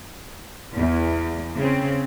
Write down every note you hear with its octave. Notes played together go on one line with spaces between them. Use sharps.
E2
C#3 C4